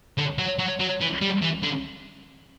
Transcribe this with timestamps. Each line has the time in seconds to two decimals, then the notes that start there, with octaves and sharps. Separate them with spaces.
0.18 D3
0.38 F#3
0.59 F#3
0.79 F#3
1.00 E3
1.21 G3
1.42 E3
1.62 D3